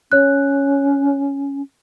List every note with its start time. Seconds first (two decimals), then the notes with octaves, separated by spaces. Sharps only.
0.12 C#4 C#5 F#6